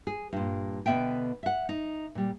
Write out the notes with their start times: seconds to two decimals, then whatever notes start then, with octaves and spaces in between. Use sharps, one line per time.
0.07 G#4
0.33 G2 A#2
0.86 B2 D3 B3 E5 G5
1.43 E5 F#5
1.69 D#4
2.15 A#2 G3